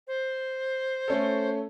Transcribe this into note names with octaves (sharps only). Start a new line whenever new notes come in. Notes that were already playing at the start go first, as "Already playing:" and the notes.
C5
A3 C#4 A4